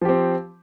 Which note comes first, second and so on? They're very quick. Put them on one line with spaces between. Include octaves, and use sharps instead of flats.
F3 G4 C4